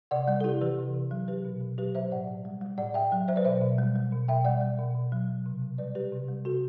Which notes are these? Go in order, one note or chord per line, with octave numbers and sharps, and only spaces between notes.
C3 D5 F#5
G3 D5 F#5
A4
C3 E4 G4
E3 G4 B4
C3
C3
F#3
F#3 G4 B4
B2
B2
F#3 G4 B4
F#3 C5 E5
A2 D5 F#5
A2
G3
G3
A2 D5 F#5
A2 E5 G5
F#3
F#3 C5 E5
B4 D5
B2 C5 E5
B2
G3
G3
B2
B2 E5 G5
G3 D5 F#5
G3
B2
B2
F#3
F#3
C3
C3
G3 B4 D5
G3 G4 B4
C3
G3
C3 F#4 A4